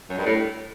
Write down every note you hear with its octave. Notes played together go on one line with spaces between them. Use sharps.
F#2
G2
A2